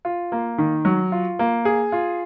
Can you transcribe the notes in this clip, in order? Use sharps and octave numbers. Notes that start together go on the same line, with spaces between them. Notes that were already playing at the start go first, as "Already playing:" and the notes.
F4
A#3
D#3
F#3
F4
A#3
G#4
F4